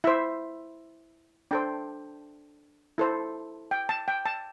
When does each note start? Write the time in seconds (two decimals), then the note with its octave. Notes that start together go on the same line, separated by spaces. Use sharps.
0.04 E4 C5 E5
1.51 D4 A4 C5 G5
2.98 E4 A4 C5
3.71 G5
3.89 A5
4.08 G5
4.26 A5